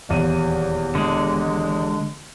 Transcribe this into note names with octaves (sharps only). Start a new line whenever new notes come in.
D#1 E2 D#7
D3 G#3